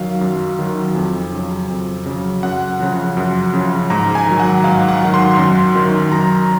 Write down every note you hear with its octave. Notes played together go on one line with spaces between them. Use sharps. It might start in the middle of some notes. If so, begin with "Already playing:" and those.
Already playing: F#2 D#3 F#3 F5
F#2
D#3 F#3
F2
C#3 F#3
F2
C#3 F#3
F#2 F#5
C#3 F3
F#2
C#3 F3
G#2 A#5
G#5
D#3 F#3
F#5
G#2 F5
F#5
D#3 F#3
C6
F#2
D#3 F#3
F#2 A#5